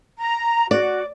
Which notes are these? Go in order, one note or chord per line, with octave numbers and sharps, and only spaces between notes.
A#5
F#4 D5